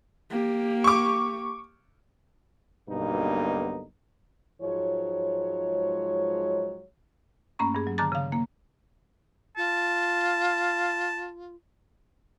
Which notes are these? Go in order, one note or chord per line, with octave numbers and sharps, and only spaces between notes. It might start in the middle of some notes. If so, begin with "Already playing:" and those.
A#3 G4
C#6 D6
B1 G2 B2 D3 A#3 D#4
G#2 F3 F#3 G#3 C#5
G2 A3 A#3 C#4 A#5 C#6
G2 G#4
F#3
D3 D#3 A5 A#5 D6 A6
C#3 F5
A#3
F4 A5